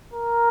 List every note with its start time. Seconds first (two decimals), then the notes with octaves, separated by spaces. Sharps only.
0.13 A#4